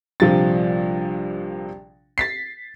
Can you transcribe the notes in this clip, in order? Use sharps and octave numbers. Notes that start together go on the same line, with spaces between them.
A#1 C3 F3 G3 A6
A6 B6 C7